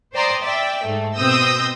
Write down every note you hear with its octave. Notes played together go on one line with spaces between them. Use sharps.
C5 D5 G5 A#5 C6 D#6
D5 E5 G5
G#2 A3
B2 C4 D#6 E6 G6 A#6